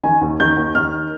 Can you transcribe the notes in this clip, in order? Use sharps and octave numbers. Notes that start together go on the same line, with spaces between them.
D#3 G#5
D#2
D#3 G6
D#2
D#3 F6